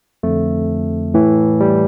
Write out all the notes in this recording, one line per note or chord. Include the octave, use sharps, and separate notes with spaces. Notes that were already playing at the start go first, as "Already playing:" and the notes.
F2 D3 A3
A2 E3
G3